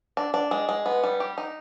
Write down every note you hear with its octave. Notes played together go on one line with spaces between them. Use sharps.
D4
D4
G#3
G#3
B3
G3
G4
D#4